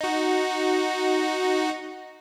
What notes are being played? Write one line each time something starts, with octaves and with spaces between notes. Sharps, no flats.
D#4 F#4